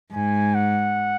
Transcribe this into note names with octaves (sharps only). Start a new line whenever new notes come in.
G#2 G#5
F#5